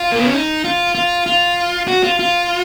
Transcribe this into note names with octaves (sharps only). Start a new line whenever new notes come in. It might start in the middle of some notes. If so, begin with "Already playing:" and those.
Already playing: F4
A#3
B3
C#4
D#4
F4
F4
F4
F#4
F4
F4